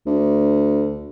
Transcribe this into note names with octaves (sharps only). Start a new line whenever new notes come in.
D2